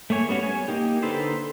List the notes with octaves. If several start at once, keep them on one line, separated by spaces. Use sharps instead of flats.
A3 A#3 C#5 G#5
G3 B3 C#4 F#4 C#5
G#5
A#3 D#4 G4
D3 D#4 A4 B4 C5